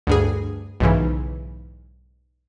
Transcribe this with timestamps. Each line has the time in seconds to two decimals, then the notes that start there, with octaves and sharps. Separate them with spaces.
0.07 D2 G2 G#4
0.80 B1 G#2 C#3 E3